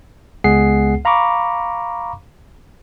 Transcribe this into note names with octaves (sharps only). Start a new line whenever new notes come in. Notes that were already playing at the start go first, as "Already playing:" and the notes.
C#2 G#3 B3 G#4 F#5 C7
F5 A#5 B5 C#6 D6